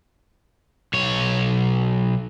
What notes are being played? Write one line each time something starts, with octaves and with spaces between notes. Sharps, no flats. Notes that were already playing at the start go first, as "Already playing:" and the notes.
B1 C#5